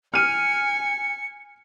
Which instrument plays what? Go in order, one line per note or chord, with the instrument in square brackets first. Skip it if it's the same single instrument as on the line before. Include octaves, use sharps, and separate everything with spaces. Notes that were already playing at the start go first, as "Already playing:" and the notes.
[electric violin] G#5 [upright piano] F6 D#7 [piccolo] C#7